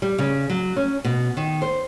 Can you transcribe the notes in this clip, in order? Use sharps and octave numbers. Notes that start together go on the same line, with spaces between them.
G3
C#3
F#3
C#4
B2
D#3
C5